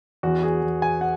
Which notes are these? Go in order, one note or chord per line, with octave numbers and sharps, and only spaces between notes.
E2 F#4
G#4
E2
G#5
F#5